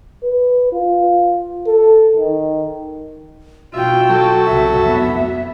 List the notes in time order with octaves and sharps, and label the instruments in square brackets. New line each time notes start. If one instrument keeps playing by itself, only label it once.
[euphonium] B4
F4
A4
D#3
[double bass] B2 [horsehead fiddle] F4 G5 [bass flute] F#4 [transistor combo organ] E5
[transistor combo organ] F#3 A4
[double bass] C2 C#3 [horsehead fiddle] E5
[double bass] F2 B3
B3